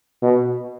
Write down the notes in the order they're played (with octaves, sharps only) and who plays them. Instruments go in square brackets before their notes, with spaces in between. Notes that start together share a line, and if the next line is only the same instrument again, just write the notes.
[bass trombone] B2